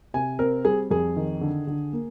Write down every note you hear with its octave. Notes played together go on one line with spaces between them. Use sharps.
C3 G#5
C4 A#4
G3 G#4
F2 G#4
D#3
D3
D3
A#3